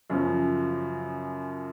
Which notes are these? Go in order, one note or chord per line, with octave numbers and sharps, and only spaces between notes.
F#2 C#3 F3